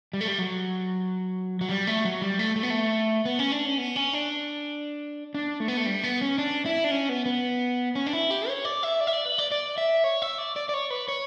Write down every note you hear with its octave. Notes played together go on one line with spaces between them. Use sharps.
G3
A3
G3
F#3
F#3
G3
A3
F#3
G3
A3
A3
B3
A3
B3
C#4
D4
C#4
B3
C#4
D4
D4
A3
B3
A3
G3
B3
C#4
D4
E4
D4
C#4
B3
B3
C#4
D4
E4
G4
C#5
D5
E5
D5
E5
D5
B4
D5
D5
E5
C#5
E5
D5
D5
D5
C#5
B4
C#5